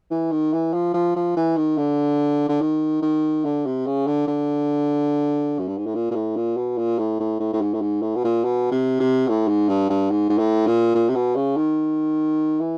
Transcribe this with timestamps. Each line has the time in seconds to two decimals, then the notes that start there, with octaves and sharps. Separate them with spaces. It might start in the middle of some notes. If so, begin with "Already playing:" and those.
0.11 E3
0.32 D#3
0.53 E3
0.73 F3
0.94 F3
1.16 F3
1.37 E3
1.57 D#3
1.77 D3
2.49 D3
2.61 D#3
3.02 D#3
3.45 D3
3.66 C3
3.86 C#3
4.07 D3
4.27 D3
5.59 F#2
5.68 G2
5.78 G#2
5.86 A2
5.95 A#2
6.11 A#2
6.15 A2
6.36 A#2
6.57 B2
6.78 A#2
6.99 A2
7.20 A2
7.40 A2
7.53 A2
7.61 G#2
7.74 A2
7.81 G#2
8.02 A2
8.16 B2
8.24 A#2
8.44 B2
8.72 C3
9.00 C3
9.28 A2
9.48 G#2
9.69 G2
9.90 G2
10.10 G#2
10.29 G#2
10.38 A2
10.67 A#2
10.95 A#2
11.09 C3
11.15 B2
11.36 C#3
11.57 D#3
12.60 E3